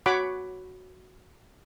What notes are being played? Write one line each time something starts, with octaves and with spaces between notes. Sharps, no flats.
F#4 C#5 F#5 B5 D6